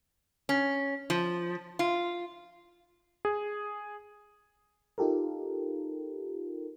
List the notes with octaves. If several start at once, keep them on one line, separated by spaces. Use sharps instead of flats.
C#4
F3
F4
G#4
D#4 F4 G4 A4 A#4